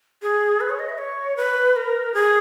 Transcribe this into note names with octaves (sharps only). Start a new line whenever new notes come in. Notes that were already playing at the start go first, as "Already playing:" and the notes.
G#4
B4
C#5
D#5
E5
C#5
B4
A#4
G#4